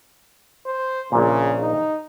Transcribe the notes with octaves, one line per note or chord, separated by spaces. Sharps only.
C5
A#1 A#2 C#3
D#4